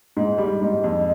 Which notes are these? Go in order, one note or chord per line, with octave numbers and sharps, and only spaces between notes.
G#2
G3
G#2
F2